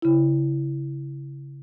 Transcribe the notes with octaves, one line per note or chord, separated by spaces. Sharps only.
C#3 E4